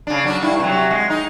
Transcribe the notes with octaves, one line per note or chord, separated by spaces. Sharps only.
C#3 D4
F#3 D4
G2 E4
C3 F#3
G#3
D#4